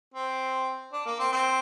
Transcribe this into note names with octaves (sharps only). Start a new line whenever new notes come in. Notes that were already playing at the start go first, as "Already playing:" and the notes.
C4
D4
A#3
C4
C4